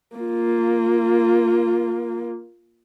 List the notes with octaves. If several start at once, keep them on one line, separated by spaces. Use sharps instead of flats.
A#3 F4